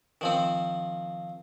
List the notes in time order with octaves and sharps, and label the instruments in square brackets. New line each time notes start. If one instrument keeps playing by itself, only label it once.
[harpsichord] D#3 F3 C4